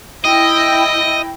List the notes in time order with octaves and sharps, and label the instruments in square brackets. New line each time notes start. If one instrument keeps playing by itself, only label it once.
[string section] E4 G5 A#6 [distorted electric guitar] D#5